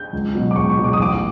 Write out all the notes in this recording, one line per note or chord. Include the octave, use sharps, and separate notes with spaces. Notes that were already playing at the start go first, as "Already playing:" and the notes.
Already playing: G6
C#2
B2 F#3
D6
C#2 C#6
C#6
B2 F#3
D6
D#6
A1 D6